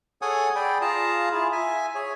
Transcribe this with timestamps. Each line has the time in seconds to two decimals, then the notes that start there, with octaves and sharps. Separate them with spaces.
0.22 G#4 A4 C#5 F#5 G#5 D#6
0.56 G#4 D5 G5 B5
0.82 F4 G#4 F5 A5 A#5
1.32 E4 F4 G#4
1.52 E5 G#5
1.95 G#4 C#5